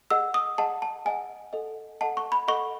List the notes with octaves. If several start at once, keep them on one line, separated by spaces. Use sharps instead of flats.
G#4 D#5 F#5 E6
D#6
G#4 D#5 F#5 A5
A5
G#4 D#5 F#5 G#5
A4 D#5 F#5
A4 D#5 F#5 A5
C#6
B5
A4 D#5 F#5 C#6